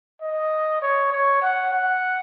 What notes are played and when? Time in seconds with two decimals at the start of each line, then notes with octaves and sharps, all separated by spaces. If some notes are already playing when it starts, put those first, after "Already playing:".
0.22 D#5
0.82 C#5
1.12 C#5
1.43 F#5
1.73 F#5